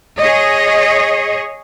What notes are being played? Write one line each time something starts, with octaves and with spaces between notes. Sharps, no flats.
G#4 C#5 D#5